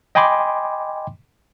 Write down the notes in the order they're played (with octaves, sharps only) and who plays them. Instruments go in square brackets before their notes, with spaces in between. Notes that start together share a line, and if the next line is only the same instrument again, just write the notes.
[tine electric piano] D#5 G5 G#5 B5 C6 D6